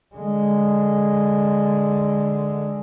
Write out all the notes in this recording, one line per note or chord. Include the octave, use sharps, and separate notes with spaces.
D3 G#3